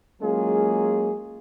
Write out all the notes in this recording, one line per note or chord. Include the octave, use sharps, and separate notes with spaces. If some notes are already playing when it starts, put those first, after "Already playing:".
F#3 G#3 A#3 C#4 F4 G#4